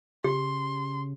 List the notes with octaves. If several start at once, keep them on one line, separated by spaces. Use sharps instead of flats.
C#3 G4 C6